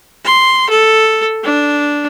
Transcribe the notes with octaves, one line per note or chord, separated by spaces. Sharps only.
C6
A4
D4